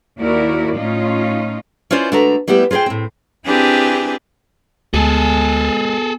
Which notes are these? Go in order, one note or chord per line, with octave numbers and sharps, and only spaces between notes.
D#2 E4 F#4 A#4 D5
A2 C#4 D#4 F4
C#4 E4 F4 C5 D5
D3 G#3 A3 F#4 B4 A#5
G3 A3 B3 E4 G4
F4 G#4 B4 C5 G5
A2 C4
C4 D4 E4 G4 G#4 B4
D2 G#3 B3 G#4 A4 G#5